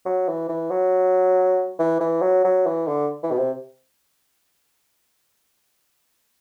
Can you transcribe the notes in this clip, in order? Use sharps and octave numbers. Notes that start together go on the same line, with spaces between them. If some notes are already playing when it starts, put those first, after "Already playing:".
F#3
E3
E3
F#3
E3
E3
F#3
F#3
E3
D3
E3
B2
C3